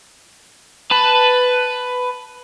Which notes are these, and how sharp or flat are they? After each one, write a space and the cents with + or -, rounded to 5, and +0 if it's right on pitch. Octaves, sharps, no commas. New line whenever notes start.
B4 +10 A5 +0